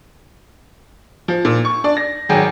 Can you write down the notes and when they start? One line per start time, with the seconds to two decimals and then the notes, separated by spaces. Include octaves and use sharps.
1.28 F3
1.45 A#2
1.65 C#6
1.84 D4 D5
1.97 A#6
2.29 G#1 F#3 G#4 G5